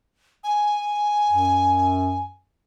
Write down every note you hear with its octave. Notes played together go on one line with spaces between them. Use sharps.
G#5
F#2